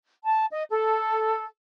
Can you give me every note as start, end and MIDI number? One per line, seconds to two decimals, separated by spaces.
0.25 0.45 81
0.52 0.63 75
0.70 1.45 69